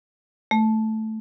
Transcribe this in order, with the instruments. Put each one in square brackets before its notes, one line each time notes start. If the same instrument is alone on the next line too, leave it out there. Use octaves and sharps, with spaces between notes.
[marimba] A3